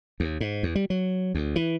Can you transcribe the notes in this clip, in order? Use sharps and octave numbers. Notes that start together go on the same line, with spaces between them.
D#2
G#2
E2
G3
F#3
D2
E3